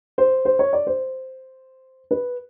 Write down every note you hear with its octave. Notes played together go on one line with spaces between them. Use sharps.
C5
C5
C#5
D5
C5
B4